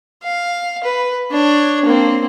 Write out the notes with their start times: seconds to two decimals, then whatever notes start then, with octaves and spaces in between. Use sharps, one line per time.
0.23 F5
0.83 B4
1.31 D4 C#5
1.85 A#3 C4